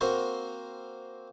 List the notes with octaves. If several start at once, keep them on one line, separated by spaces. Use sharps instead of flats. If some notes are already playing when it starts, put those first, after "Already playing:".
A#3 C4 F#4 A#4 C5 F#5